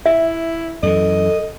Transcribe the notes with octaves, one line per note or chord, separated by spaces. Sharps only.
E4 E5
F#2 E3 A4 D#5